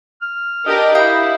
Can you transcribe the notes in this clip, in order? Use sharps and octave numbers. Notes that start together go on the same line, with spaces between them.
F6
D4 G4 A#4 D#5
E4 G4 F5 D#6 G6